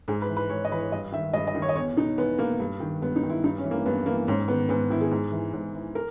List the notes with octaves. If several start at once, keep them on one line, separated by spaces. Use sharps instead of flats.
G#2 G#4
B4
E3
B4
G#2 C#5
D#5
E3 B4
C#5
G2 D#5
D#3 E5
G2 D#5
D#5
D#3
C#5
D#5
E2 C#5
B2 D#4
E2 B3
B2 A#3
G2
D#3
G2 B3
D#4
D#3
E4
G2 D#4
C#4
E3
A#3
G2 B3
E3 A#3
G#2 C#4
D#3 B3
G#2 B3
D#3 E4
G#4
G#2
E3
G#2
E3
A#4